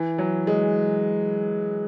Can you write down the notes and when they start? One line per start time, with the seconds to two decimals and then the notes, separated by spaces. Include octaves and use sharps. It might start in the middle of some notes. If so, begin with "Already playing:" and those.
Already playing: E3
0.18 F#3
0.47 G#3